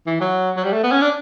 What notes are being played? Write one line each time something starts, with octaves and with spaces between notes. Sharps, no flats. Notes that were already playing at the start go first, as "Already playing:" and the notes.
E3
F#3
F#3
G3
A3
B3
C#4
D4